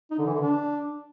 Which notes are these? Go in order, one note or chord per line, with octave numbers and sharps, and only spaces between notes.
D#4
D3
E3
D3
D4